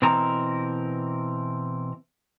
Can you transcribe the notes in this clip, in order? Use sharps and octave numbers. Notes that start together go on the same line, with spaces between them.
B2 E3 C4 A#4 A#5